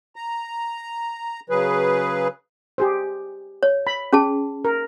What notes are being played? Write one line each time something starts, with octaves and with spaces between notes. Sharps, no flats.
A#5
C#3 F#3 G#4 B4
G4 G#4 C5
C#5
B5
C#4 G#4 A5
A#4